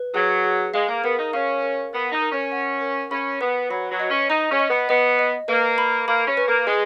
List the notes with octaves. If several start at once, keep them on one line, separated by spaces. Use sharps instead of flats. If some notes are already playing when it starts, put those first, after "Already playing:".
Already playing: B4
F#3 G#4
G#4
G#3 F5
A#3
B3 A#4
D#4
C#4 F5
A#4
B3 A#4
D#4
A#4
C#4
F#5
A#4
C#4 B5
B3 B4
F#3 B5
F#3
D#5
C#4
D#4 D#5
C#4
D#5
B3
B3 D#5
D#5
A#3 B4
B5
A#3 B5
C#4
B4
A#3
G#3 G#4